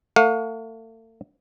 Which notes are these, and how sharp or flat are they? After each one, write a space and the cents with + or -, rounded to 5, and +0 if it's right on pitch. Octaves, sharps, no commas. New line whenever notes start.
A3 +40 F5 +40